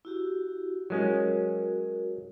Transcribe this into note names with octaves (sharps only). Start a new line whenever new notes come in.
E4 F#4 G4
F#3 G#3 C#4 F#4 A#4